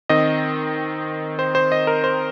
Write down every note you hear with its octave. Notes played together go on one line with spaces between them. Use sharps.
D#3 C4 D#5
C5
C5
D#5
A#4
C5